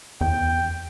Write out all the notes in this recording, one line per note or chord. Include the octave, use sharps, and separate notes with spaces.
E2 G5